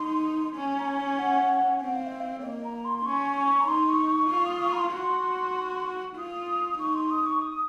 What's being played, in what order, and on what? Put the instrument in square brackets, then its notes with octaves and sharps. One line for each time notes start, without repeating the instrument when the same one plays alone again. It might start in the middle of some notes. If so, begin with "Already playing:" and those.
Already playing: [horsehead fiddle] D#4 [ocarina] C6
[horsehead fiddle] C#4
[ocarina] A#5
G#5
F#5
[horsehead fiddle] C4 [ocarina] F#5
[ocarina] F5
D#5
F5
C#5
[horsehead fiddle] A#3 [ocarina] D#5
[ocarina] A#5
C6
C6
[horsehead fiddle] C#4 [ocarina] C#6
[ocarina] C#6
A#5
[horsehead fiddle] D#4 [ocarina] C6
[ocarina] C#6
C#6
[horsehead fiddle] F4 [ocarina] C#6
[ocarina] D#6
D#6
C#6
A#5
C6
[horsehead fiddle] F#4 [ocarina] C6
[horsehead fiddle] F4 [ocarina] D#6
[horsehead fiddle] D#4 [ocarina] C#6
[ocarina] C6
D#6
C#6
D#6